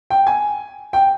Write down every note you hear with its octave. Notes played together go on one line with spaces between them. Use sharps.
G5
G#5
G5